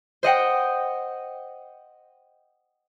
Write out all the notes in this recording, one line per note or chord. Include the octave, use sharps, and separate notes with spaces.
C5 D#5 F#5 G5